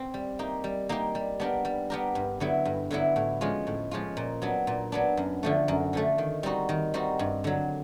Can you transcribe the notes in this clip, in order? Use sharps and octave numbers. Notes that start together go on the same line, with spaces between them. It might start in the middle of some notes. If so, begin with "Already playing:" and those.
Already playing: C4
G3
A#3 D#4 G4
G3
A#3 D#4 G4
G3
B3 D4 G4 A#4
G3
B3 D4 G4 A#4
G2
D3 F#3 B3 E4
G2
D3 F#3 B3 E4
A2
F3 G#3 C#4 F4
A2
F3 G#3 C#4 F4
A#2
F#3 B3 D4
A#2
F#3 B3 D4
F#2
D3 F3 A3
F#2
D3 F3 A3
D#3
G3 C4 D#4 F#4
D#3
G3 C4 D#4 F#4
G2
D3 F#3